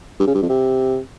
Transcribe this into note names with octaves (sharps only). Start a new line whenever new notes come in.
G2
C#3
G2
F2
C3